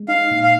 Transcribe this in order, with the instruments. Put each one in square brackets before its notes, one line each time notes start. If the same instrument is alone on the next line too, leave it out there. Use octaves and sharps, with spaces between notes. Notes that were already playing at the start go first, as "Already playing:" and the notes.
Already playing: [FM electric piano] G#3
[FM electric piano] D#4 [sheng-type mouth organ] F5
[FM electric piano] A#2
[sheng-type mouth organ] F5